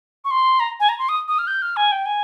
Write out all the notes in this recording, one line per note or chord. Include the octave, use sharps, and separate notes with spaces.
C#6
C6
A#5
G#5
A#5
C6
D#6
D#6
F6
G6
F6
G#5
G5
G#5